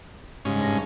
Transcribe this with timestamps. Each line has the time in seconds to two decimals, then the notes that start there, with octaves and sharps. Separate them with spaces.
0.45 G#2 C#3 G3 C#4
0.59 G2 A#6